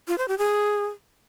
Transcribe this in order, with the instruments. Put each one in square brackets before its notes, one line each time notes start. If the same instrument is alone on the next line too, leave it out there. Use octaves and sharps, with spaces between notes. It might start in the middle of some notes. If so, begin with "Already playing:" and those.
[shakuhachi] F4
C5
G4
G#4